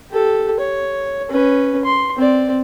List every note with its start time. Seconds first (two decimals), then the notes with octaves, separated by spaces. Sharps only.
0.11 G4 A4
0.60 C#5
1.29 C#4 B4
1.85 C6
2.17 C4 D5